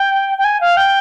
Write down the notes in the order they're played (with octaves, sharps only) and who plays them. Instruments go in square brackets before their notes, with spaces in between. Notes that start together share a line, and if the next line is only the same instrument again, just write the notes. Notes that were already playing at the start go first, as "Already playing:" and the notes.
Already playing: [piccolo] G5
G5
G#5
F5
G5